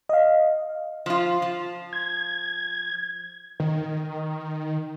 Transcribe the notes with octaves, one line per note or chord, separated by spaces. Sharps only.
D#5 F5
F3 F4
F3
G#6
D#3